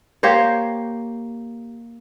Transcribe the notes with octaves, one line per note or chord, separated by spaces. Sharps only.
A#3 G4 C5 C#5